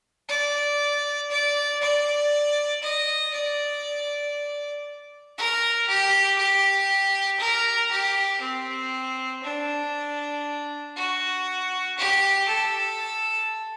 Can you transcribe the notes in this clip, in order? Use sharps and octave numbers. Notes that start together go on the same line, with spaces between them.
D5
D5
D5
D#5
D5
A#4
G4
G4
A#4
G4
C4
D4
F#4
G4
A4